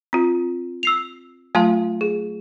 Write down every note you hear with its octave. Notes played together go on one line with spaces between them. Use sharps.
C4 F4
E6 C7 F7
F#3 A3 F4 F5 A5 C6
G#4